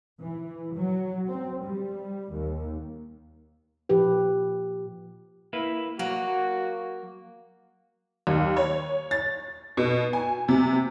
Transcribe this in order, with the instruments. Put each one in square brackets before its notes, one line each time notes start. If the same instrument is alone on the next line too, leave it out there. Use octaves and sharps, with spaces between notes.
[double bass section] E3
F#3
C4
G3
D#2
[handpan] A#2 F3 G4 B4
[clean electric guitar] A#3 E4 B4
[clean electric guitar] F#3 [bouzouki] A#3 [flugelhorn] F#4
[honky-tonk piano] D#2
C#5
A6
B2
G#5
C3